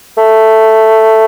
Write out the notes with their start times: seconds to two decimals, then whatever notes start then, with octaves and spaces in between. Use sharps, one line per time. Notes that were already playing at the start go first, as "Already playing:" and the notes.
0.18 A3